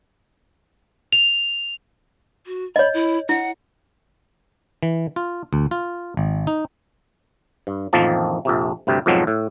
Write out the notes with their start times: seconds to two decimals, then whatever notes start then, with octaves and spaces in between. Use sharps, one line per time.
1.13 F7
2.45 F#4
2.76 C#5 D#5 B5
2.94 E4
3.29 E4 F#5
4.83 E3
5.16 F4
5.53 D2
5.71 F4
6.17 G#1
6.47 D#4
7.67 G2
7.93 A1 F2 D#3 F3 A#3 A5
8.45 A#1 F2 C3
8.87 D2 G2 C3 G5
9.06 F2 G#2 B2 F3 F#3 C4
9.27 A2